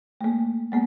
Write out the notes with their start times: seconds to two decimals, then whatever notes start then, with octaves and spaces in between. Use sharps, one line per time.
0.21 A3 A#3
0.72 G#3 A#3 B3